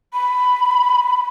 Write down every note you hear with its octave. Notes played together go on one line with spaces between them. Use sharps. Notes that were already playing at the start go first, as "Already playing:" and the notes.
B5